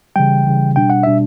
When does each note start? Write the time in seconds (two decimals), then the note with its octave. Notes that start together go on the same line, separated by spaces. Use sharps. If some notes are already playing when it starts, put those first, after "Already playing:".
0.16 C#3 E3 G3 G5
0.46 C#3 E3 G3
0.76 B2 G3 D4 G5
0.90 F#5
1.03 B2 G3 D4 E5